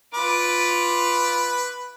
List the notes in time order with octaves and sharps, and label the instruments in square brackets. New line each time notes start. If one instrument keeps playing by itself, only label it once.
[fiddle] F4 D6 [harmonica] B4